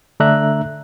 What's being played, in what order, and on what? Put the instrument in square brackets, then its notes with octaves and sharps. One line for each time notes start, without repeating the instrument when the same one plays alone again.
[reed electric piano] D3 A3 D4 E5 A#5 F#6